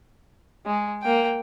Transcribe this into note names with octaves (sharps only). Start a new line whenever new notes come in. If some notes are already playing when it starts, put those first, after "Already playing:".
G#3
A#3 G5